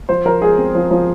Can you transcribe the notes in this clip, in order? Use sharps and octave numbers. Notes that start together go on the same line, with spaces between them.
F3 C5
F3 A#4
G#3 G#4
C4
F3
F3